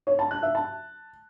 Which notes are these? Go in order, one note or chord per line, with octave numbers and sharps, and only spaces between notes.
C#5
A5
F#6
E5
A5